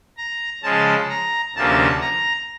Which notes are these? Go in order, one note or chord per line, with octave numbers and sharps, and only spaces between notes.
A#5
C#3 F3 G#3 C#4 A5
A#5
D2 C3 F3 A#3 C#4 A5
A#5